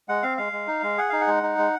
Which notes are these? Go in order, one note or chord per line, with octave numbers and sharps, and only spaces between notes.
G#3 F#5
C4 F5
G#3 F5
G#3
D#4
G#3
G#4 F#5
D#4 F5
F#5
G#3
D#4
G#3